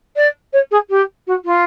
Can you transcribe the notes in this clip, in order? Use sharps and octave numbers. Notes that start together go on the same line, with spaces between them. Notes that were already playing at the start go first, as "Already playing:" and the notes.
D5
C#5
G#4
G4
F#4
F4